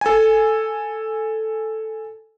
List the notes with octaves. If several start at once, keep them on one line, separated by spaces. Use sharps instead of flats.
A4 G#5